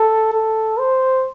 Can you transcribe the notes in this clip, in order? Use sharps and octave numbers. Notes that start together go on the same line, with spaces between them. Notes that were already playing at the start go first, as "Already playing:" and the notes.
Already playing: A4
A4
C5